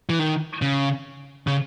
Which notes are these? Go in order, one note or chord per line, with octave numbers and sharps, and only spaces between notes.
E3
D#3
C#3
C#3